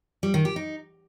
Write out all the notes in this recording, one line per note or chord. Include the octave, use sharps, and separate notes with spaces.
G3
D#3
G4
D#4